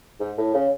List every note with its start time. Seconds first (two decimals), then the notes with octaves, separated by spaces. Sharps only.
0.20 G#2
0.38 A2
0.54 C#3